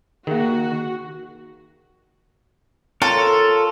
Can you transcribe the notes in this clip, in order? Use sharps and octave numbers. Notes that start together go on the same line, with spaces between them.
D#3 A#3 F#4 G#4
F4 A4 A#4 C#5